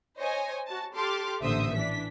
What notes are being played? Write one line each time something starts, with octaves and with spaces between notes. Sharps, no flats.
C5 C#5 D#5 G#5
F#4 A5
G4 A4 A5 C6 D6 F6
A1 A#2 D3 C5 E5 D#6
E3 D4 B6